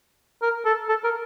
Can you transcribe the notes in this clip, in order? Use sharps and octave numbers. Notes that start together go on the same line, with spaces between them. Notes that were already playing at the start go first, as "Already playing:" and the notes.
A#4
A4
A4
A#4